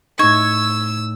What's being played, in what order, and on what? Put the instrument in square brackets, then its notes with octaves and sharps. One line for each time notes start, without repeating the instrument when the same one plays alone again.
[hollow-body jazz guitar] A2 D#4 [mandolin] C#6 [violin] E6 [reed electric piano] G#6